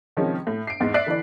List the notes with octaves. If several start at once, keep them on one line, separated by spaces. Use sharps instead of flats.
C3 D#3 F3 G#3 C#4
A2
C7 D7
E2 G#2 A6
D5 E5 F#6 B6 C7 D7
D3 E3 E4 D5